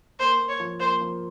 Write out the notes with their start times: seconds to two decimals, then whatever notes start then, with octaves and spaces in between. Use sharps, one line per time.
0.19 A#3 C5
0.39 A#3
0.49 C#5
0.60 F3
0.80 A#3 C5
1.01 F3